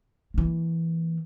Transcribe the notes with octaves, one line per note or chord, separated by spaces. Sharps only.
E3 A#3